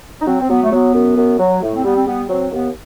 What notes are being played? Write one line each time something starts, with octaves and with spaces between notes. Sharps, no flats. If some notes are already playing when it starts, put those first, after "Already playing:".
D#4
F#3 C4
C4
F#3 B3
A3
F#3 B3
F#2
F#2
F#3
A2 A3
C4
G3 B3
C4
G3 B3
F#3 C4
D#2 B3